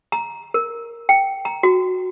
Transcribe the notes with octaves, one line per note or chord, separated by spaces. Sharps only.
A#5
A#4
G5
A#5
F#4